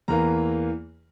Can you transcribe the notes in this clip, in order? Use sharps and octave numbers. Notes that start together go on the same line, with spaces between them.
E2 E3 A#3 A#5